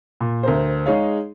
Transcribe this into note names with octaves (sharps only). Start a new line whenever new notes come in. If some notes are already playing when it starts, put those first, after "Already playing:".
A#2
D2 A#4 C5
G#3 D#4 G#4 C#5 F5